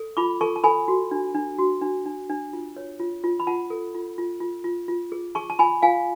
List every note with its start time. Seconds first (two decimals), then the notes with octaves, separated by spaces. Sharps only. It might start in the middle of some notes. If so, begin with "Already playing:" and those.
Already playing: A4
0.17 F4 B5 D6
0.41 A4 A5 C#6
0.56 A5
0.64 A4 G#5 B5
0.88 F#4
1.11 D4
1.35 D4
1.59 F#4
1.81 D4
2.06 D4
2.30 D4
2.53 F4
2.77 C#5
3.00 F4
3.24 F4
3.40 B5
3.47 F4 F#5 A5
3.70 A4
3.94 F4
4.18 F4
4.41 F4
4.64 F4
4.88 F4
5.12 G#4
5.35 G#4 A5 C#6
5.50 A5
5.59 F4 G#5 B5
5.82 F4 F5 G#5